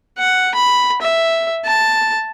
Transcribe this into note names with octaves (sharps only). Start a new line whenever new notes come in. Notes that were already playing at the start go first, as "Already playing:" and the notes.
F#5
B5
E5
A5